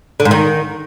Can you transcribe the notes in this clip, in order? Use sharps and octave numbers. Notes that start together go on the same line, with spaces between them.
D3
G#2
D#3